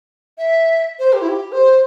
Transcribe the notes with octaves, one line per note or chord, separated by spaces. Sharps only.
E5
C5
G4
E4
G4
C5